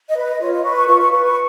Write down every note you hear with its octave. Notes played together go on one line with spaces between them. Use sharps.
D#5
B4
D#5
F4 C#5
D#5
B4 C#6
C#6
F4 C#6
C#6
B4 C#6
C#6